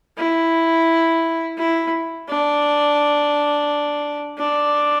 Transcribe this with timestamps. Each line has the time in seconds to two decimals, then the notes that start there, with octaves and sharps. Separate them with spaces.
0.18 E4
1.58 E4
2.29 D4
4.38 D4